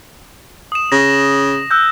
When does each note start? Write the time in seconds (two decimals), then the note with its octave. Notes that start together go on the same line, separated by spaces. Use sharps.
0.72 D#6 E7
0.92 C#3 A#6
1.71 E6 F#6 G6